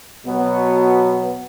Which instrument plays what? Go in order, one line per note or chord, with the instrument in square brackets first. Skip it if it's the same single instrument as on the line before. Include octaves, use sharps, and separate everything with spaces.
[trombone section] B2 F#3 B3 F#4